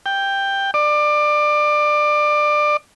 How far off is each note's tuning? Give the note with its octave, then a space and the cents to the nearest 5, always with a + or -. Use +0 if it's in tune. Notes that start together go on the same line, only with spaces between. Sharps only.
G5 +5
D5 +25